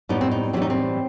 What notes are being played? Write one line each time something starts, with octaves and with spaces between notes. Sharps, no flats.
A2 G3 B3 D#4
C4
D#4
A2 E3 G3 B3 C4
D#4
C4